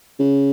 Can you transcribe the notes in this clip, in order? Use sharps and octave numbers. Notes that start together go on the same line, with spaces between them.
C#3